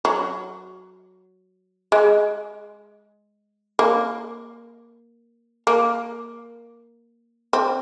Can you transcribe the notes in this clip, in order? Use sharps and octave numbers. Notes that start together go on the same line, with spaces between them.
F#3
G#3
A#3
A#3
C4